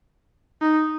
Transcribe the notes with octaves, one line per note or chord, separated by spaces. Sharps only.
D#4